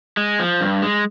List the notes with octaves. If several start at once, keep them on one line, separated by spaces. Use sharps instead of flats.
G#3
F3
G2
G#3